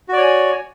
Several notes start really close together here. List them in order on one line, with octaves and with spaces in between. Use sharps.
F#4 D5 C#5 G#5